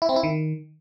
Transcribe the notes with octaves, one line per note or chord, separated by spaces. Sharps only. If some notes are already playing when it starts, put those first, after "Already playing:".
E4
C4
E4
D#3